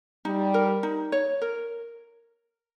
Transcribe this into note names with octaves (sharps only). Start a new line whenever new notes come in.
G3 D#4
A#4
D#4
C#5
A#4